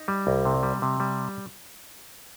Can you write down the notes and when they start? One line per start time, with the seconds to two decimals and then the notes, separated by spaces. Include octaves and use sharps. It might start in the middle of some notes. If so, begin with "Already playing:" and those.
Already playing: D#4
0.08 G3
0.27 C2
0.45 C3
0.63 G3
0.82 C3
1.00 G3